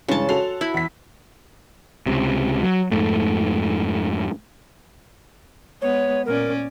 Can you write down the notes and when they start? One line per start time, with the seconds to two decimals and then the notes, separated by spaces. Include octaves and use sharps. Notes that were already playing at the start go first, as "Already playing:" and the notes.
0.08 G2 C#3 E3 G#3 A5
0.29 F#4 A4 C6 F7
0.61 E4 B5
0.74 E2 B6
2.06 C#2 C3
2.63 F#3
2.91 F2 G#2 A3
5.82 G#3 B3 C#5
6.26 A#2 C#4 A#4 D5